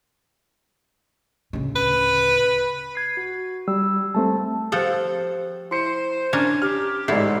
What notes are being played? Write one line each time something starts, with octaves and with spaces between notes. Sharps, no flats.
D1 C#3
B4
G#6 C7
F#4
G3 E6
G3 A3 C4 A5
F3 G4 A4 C5 F#5
E4 C5 C6 C#7
C#4 D4 A#4 G#6
G4 F6
A1 G#2 A3 E4 D5 C7